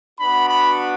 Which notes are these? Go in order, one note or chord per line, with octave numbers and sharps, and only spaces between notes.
B3 D4 F#4 B5
B5